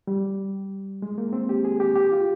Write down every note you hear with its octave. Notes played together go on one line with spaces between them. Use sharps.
G3
G#3
A#3
C4
G4
G#4
G4
G4
F4